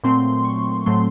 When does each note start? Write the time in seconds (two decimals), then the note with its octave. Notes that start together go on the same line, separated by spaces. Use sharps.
0.04 A#2 F#3 A3 C4 C6
0.45 C#6
0.86 A2 F#3 A3 C4 C6